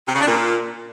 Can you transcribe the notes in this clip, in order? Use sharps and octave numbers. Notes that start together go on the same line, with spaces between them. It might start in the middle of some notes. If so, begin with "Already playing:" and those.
C3
C#3
D4
A#2